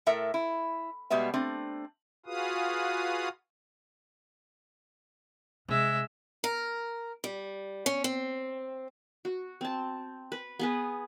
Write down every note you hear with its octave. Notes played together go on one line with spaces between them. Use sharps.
A2 A4 A#4 E5
E4
B2 G3 G#3 B3 E5
A3 C4 D4
F4 F#4 G#4 B4 F5 D#6
C3 G#3 E5
A#4
G3
C#4
C4
F#4
C4 A5
B4
B3 G#4 B4